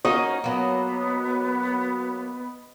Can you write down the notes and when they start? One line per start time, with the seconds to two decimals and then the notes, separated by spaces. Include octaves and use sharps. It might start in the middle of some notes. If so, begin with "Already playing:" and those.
0.05 A#3 C#4 D#4 F#4 D#5
0.44 F#3 A#3 B3